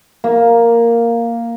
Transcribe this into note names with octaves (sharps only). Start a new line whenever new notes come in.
A#3